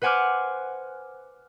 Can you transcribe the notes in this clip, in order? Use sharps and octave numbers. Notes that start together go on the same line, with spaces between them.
B4 C5 F#5 G#5 D6 F6